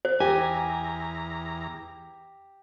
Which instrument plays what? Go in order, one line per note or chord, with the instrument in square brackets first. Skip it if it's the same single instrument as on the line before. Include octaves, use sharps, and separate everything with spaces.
[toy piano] C5
[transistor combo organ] E2 A#5 [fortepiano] G4 [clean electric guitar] G#5